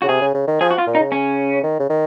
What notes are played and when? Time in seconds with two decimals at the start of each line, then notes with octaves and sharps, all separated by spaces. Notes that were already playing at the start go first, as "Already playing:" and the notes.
0.02 C#3 F#4
0.08 C3 G#4
0.21 C#3
0.34 C#3
0.47 D#3
0.61 F3 G#4
0.71 F#4
0.78 F4
0.87 A#2
0.95 D#4
0.99 C#3
1.12 C#4
1.63 D#3
1.79 C#3
1.90 D#3